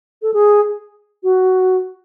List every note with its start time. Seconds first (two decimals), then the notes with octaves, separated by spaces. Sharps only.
0.22 A4
0.34 G#4
1.23 F#4